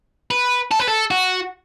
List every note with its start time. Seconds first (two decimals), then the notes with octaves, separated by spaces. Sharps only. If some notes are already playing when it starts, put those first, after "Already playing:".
0.31 B4
0.71 A4
0.80 B4
0.88 A4
1.11 F#4